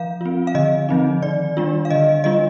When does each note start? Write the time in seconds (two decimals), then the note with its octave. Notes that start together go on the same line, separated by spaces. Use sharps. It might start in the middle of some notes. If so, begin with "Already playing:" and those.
Already playing: F3 F5
0.21 C4 F4
0.47 F5
0.55 D3 D#5
0.89 F3 C4 D#4
1.22 D#3 D5
1.57 G3 D4 F4
1.85 F5
1.90 D3 D#5
2.24 G3 D4 F4 D#5